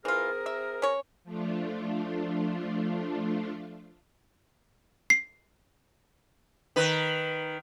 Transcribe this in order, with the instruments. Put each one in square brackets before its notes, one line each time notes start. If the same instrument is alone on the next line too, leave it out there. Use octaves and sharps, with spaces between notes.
[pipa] E3 F4 [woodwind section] C4 G#4 A#4
[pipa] E5
C#4 C#5
[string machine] F3 A3 D4 F4
[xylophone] C7
[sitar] D#3 B4